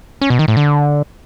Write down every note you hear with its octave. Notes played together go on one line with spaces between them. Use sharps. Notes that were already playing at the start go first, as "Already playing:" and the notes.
C#4
B2
D#3
A2
D3